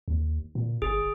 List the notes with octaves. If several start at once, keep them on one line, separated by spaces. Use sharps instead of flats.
D#2
A#2
G1 G#4